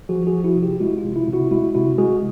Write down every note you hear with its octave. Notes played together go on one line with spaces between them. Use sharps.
F3 F#4 G#4
F#4 G#4
F3
E4 F#4
C3
F4 G4
G#3 E4 F#4
F4
C3
E4
C3
E4 F#4
G#3 E4 F#4
C3 E4 F#4
G#3 F#4 G#4